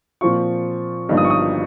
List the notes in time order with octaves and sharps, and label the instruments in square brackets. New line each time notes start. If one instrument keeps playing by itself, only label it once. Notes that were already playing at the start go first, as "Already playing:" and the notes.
[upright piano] A#2 F3 C4 F4 C#6
G1 G2 F3 A#3 D#4
D#6
C#6
D#6